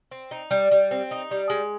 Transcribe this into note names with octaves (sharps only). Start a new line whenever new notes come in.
C4
D#4
G3
G3
C4
D#4
G3
G#3